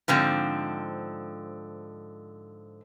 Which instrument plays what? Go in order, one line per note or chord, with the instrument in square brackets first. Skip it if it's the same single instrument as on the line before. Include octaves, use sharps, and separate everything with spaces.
[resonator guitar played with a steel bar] G#2 D3 F3 C4